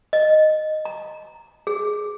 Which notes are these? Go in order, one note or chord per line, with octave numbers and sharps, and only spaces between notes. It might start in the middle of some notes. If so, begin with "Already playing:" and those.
D#5
A#5
G#4